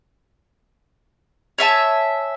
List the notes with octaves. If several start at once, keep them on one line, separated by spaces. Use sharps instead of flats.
C#5 E5 G#5 A5